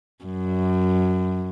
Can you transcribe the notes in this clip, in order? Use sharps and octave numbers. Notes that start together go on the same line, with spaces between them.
F#2